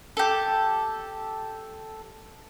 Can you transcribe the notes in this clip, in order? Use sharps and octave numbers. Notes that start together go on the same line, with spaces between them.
G4 A4